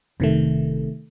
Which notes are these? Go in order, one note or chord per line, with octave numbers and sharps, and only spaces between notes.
F1 C3 D#3 A3